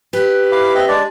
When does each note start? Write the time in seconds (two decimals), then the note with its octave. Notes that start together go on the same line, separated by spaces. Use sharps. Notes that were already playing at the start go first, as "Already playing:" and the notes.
0.13 G4 B4
0.52 E4 F5 D6
0.75 C4 D#5 E5
0.88 G#3 D4 D5